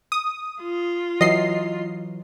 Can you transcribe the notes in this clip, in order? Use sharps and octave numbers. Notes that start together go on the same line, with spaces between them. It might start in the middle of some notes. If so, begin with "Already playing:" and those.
D#6
F4
E3 F#3 D#5 C7